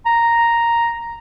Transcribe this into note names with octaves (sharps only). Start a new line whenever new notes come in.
A#5